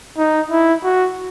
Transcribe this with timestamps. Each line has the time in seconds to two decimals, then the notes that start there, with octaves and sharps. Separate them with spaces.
0.18 D#4
0.51 E4
0.84 F#4